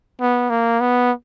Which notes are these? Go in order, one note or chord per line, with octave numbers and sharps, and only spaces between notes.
B3
A#3
B3